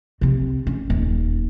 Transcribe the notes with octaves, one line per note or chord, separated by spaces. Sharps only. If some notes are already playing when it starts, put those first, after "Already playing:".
C3 C4
C#4
D#1